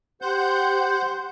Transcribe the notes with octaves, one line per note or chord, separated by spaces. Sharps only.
G4 C5 F#5 G6